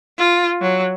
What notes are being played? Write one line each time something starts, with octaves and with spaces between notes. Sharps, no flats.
F4
F#3